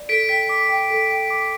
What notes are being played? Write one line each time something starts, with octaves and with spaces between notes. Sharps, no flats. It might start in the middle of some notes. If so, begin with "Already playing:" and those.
Already playing: D5
A4 B6 D7
G5 B6
D6
G5
A4
G5
D6